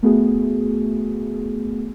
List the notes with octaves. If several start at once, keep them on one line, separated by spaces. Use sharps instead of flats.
A3 B3 F#4 G#4